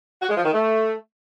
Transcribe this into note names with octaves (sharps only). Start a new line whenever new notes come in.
F#4
G#3
F3
D#3
A3